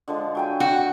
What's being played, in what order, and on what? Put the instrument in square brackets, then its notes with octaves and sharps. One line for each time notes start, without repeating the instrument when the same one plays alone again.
[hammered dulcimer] D3 F3 G#3
F#3 G5 G#5
[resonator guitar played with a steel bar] F#4 [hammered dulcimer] G5